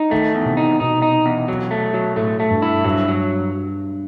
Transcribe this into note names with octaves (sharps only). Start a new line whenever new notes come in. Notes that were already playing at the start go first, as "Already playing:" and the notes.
Already playing: D#4
D#3 A3
E2
C3
D#4
B2 D#4
D#4
E2
F#3
A3
F#3
A2 A3
A3
G2
E4
G2 F#3
F#3